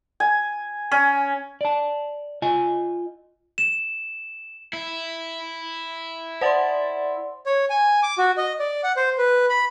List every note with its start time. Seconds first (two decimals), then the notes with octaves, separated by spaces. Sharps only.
0.20 G#5
0.92 C#4
1.61 D5 A5
2.42 F4 D#5 G#5
3.58 E7
4.73 E4
6.41 C5 D5 F#5 C6 A6
7.46 C#5
7.70 G#5
8.03 D6
8.18 F#4
8.37 D#5
8.59 D5
8.84 F#5
8.97 C5
9.18 B4
9.50 B5